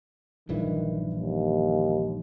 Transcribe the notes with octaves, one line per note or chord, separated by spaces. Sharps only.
A#1 G2 D#3 E3
D#2